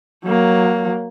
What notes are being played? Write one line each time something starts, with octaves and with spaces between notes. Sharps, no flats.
F#3 A#3